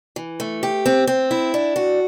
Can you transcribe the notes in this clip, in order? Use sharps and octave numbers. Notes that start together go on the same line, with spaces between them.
E3
A3
G4
C4
C4
E4
D4
F#4